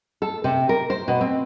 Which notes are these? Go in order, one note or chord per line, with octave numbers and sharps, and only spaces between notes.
A4
C3
A#4
C5
B2
C4